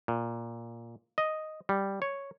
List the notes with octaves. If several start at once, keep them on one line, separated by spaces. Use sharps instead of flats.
A#2
D#5
G3
C#5